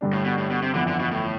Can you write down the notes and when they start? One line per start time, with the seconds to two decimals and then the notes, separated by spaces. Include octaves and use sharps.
0.01 G2 D3 G3 D4
0.13 A2
0.25 B2
0.38 A2
0.50 B2
0.62 C3
0.74 G1 F2 D3 E3 B3 E4
0.88 D3
1.00 B2
1.11 A2